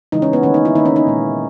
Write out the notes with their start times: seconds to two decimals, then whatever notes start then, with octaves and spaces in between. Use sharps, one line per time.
0.12 C#3 E3 G#3 D#4
0.22 C#4
0.33 B3
0.43 D#3 A#3 C#4
0.54 D#4
0.65 E4
0.75 D#3 D#4
0.78 A#3
0.86 C#4
0.96 D#4
1.07 A#2 G#3